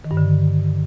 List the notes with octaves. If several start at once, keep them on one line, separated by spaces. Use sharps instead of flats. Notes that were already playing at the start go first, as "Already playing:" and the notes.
D#3
G2
D3